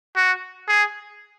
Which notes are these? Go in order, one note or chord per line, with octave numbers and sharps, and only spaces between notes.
F#4
G#4